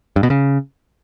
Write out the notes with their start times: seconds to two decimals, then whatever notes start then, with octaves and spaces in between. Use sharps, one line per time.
0.16 G2
0.23 B2
0.30 C#3